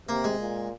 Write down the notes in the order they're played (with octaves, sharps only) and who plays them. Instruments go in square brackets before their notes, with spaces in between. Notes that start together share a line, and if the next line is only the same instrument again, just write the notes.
[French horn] C3 [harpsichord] A#3
[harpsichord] G#3
[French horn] A#2